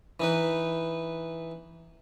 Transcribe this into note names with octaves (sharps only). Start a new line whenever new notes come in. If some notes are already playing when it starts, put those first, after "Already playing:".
E3 D#4 B4